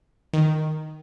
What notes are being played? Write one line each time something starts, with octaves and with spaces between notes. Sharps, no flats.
D#3